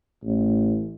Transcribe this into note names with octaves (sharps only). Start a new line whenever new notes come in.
A1